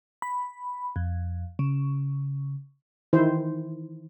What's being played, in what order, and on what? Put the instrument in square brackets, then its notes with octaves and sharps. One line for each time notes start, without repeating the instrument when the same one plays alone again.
[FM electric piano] B5
F2
C#3
[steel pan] D#3 E3 E4 C5